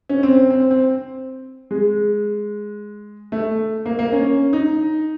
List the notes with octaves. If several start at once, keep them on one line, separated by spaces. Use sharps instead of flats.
C#4
C4
C4
C4
C4
G#3
A3
A#3
A#3
C#4
D#4